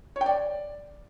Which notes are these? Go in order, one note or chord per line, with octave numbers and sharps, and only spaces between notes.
C#5
G5
D5